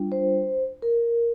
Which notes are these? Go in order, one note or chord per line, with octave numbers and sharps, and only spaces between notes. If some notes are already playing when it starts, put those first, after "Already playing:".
Already playing: G3 D4 F4
C5
A#4